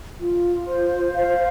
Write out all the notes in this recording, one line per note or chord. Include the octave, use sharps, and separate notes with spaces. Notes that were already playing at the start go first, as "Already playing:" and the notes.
F4
C5
F5